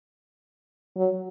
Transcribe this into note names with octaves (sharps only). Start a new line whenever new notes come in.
F#3